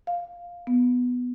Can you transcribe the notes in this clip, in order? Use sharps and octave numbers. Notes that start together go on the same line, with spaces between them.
F5
B3